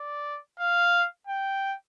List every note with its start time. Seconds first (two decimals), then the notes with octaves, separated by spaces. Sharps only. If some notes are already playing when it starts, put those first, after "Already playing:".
Already playing: D5
0.59 F5
1.27 G5